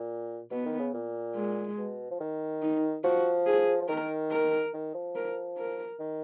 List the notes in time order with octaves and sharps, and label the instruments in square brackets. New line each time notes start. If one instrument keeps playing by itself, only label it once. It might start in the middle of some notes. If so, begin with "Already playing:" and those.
Already playing: [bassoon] A#2
[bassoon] B2 [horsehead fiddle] B3
[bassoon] D#3
C#3
A#2
[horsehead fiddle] G#3
[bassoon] B2
F3
D#3
[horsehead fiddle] D#4
[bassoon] F3 [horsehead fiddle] F#4
[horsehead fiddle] G#4
[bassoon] F3
[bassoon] D#3 [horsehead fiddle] A#4
[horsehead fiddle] A#4
[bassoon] D#3
F3
[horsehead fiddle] A#4
A#4
[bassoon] D#3